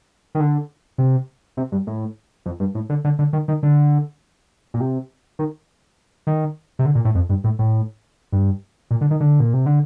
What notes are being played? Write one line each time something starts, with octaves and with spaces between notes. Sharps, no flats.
D#3
D3
C3
C3
G2
A2
F2
G2
A2
D3
D3
D3
D#3
D#3
D3
A#2
C3
D#3
D#3
C3
D3
A#2
A2
F2
G2
A2
A2
G2
A#2
D3
D#3
D3
A#2
C3
D3